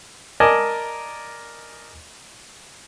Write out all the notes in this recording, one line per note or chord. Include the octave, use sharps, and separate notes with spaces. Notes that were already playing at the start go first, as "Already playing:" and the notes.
A#4 D5 D#5 G#5 A5